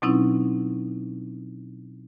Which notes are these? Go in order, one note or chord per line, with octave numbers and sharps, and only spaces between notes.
B2 F#3 C4 C#4 D#4 E4